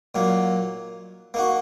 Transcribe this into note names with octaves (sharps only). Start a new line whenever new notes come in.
A#2 F#3 A#3 D#4
A#3 D#4 F#4